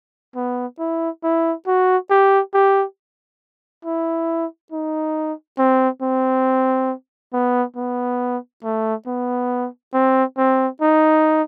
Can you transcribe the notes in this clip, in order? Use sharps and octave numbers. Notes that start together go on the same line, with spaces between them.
B3
E4
E4
F#4
G4
G4
E4
D#4
C4
C4
B3
B3
A3
B3
C4
C4
D#4